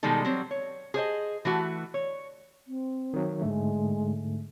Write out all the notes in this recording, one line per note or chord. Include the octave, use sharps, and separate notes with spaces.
B2 D#3 G3 G#3 D#4 A4
F#3 G3 C4
C#5
G#4 C5 D5 D#5
E3 A3 F#4
C#5
C4
D#3 F#3
G#2 D3 G#3 A3